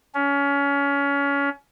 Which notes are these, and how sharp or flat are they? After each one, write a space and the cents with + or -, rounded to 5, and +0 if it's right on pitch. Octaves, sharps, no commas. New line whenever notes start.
C#4 +25